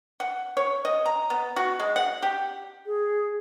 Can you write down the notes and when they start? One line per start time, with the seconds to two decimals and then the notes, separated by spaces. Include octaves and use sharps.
0.20 F#5
0.57 C#5
0.85 D#5
1.06 A#5
1.30 B3
1.56 F#4
1.80 G#3
1.96 F#5
2.22 G4
2.86 G#4